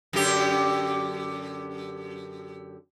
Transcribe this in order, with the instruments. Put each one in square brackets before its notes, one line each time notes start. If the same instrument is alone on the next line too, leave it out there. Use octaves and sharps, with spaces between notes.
[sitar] F#2 D3 G4